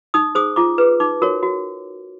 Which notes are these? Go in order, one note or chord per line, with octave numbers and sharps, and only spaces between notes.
D#4 D#6
G#4 C5 D#6
F4 D6
G#4 B4
D#4 D6
F#4 A#4 C#5
F#4